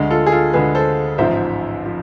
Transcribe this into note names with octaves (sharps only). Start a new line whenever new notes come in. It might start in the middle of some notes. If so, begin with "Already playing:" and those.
Already playing: D2 D3 G#3
F4 A4
G#4
F4 A4
D2 D3 G#3 G#4 B4
A4 C5
A1 G#2 F3 C5 E5
F3